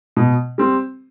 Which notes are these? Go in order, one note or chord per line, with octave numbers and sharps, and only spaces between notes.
B2
G3 C4